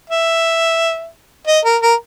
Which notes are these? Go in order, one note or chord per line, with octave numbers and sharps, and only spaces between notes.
E5
D#5
A#4
A#4